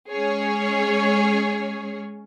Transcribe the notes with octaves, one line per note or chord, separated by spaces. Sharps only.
G#3 C#4 G#4 C#5